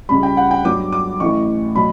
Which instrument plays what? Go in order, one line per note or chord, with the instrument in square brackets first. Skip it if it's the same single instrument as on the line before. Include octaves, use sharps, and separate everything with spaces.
[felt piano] C#2 C#3 G3 B5
G5
F#5
G5
G2 F#3 B3 D6
D6
A1 A2 E3 C#6
B2 F#3 B5